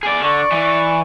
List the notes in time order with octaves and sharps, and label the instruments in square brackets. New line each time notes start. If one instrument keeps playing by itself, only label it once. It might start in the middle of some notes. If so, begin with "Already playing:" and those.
[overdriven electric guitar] G#4 D5
[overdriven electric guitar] D3 [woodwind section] D5 C#6
[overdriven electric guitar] E3